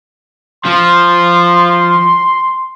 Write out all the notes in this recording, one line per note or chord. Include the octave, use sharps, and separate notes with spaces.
F3 C6